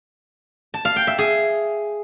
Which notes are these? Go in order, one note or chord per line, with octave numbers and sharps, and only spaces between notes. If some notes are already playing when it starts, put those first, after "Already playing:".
A5
F5
G5
E5
G#4